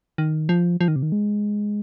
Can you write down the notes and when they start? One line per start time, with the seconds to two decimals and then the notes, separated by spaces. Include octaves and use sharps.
0.18 D#3
0.49 F3
0.81 F3
0.88 D#3
0.96 C3
1.03 D#3
1.12 G#3